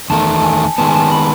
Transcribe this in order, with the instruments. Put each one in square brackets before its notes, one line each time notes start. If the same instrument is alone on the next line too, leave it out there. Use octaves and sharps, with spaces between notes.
[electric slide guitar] E2 D#3 A3 [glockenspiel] A5
[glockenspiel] A5
G#5
[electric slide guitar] D#3 G#3 B3 [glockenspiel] A5
[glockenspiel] G#5
A5
A5
B5